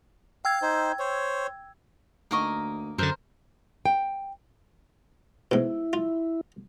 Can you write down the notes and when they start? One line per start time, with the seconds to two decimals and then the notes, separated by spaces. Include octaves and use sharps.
0.45 F5 G5 E6 G#6
0.62 D#4 C5
0.99 C5 C#5
2.31 D2 A#3 D#4 A#4 D#5 F#5 C#6
2.98 F#2 D3 A#4 C5
3.86 G5
5.51 G#2 B2 E4
5.93 F4